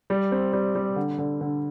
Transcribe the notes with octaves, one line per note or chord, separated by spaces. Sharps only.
G3
C4
G3
G3
D3
D3
D3